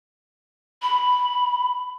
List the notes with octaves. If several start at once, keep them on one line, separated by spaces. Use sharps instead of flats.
B5